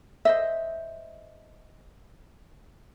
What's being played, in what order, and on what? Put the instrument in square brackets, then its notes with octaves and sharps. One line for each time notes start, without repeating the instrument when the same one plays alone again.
[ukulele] C5 D#5 E5